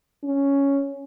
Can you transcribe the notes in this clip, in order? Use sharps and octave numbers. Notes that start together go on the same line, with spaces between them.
C#4